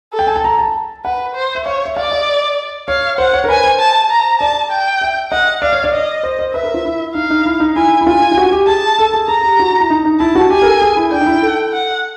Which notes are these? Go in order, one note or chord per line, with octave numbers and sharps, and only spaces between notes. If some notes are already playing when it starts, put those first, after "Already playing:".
A4
G5
G#5
A5
A#5
A5
B4 F#5
C5
E5
C#5 F5
E5
D5 F5
D#5
C#5 F5
C5 F#5
C#5
A#4
B4 G#5
C5
A5
A#5
D5 A5
G5
E5
D#5 F#5
D5 F5
C#5
D5
D#5
C5
C5
B4 E5
A#4
F4
E4
D#4 F5
D#4
E4
D#4
E4 G#5
E4
F4 G#5
F4
F#4
G4
G#4 A5
A4
G#4
G#4 A#5
G4
F#4
E4
D#4
D#4
E4 A5
F#4
G4 G#5
A#4
A4
G#4
E4
D4 G5
D#4
E4
A4
F#5